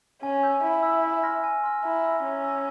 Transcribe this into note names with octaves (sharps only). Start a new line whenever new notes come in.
C#4 G#5
E6 G6
E4 G#5
E6 G6
G#5
C6 F6 A#6
G#5
C6 F6 A#6
E4 A#5
E6 A#6
C#4 A#5
E6 A#6